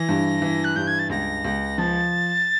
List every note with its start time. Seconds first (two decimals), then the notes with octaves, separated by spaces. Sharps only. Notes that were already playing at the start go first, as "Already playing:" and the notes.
Already playing: E3 A#6
0.09 G2
0.42 E3
0.64 F#6
0.76 G2 G6
0.87 G#6
0.99 A6
1.10 C#2 A#6
1.44 C#2
1.78 F3 A6